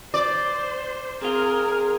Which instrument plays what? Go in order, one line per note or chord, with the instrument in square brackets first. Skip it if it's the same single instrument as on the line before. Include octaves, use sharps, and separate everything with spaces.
[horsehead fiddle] C5 [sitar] D5
[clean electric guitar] C4 F4 [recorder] G#4 [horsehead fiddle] A#4